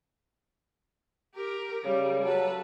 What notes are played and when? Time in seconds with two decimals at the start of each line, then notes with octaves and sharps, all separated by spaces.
1.34 G4 A#4
1.84 C#3 G3
2.24 F#3 A4 B4